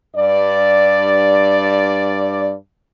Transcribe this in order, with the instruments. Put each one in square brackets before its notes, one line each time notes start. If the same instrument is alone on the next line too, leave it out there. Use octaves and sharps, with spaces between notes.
[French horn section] G2 D5